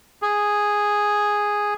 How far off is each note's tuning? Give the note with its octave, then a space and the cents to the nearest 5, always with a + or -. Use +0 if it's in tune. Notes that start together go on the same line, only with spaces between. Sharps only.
G#4 -5